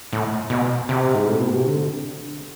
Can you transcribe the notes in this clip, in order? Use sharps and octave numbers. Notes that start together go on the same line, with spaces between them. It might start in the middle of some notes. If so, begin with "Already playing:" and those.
A2
B2
C3
G#2
A2
B2
C3
D3